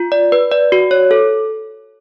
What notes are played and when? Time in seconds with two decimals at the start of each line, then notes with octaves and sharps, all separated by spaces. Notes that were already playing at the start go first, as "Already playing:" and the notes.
Already playing: F4
0.12 D5
0.32 B4
0.51 D5
0.72 F#4
0.91 C#5
1.11 A4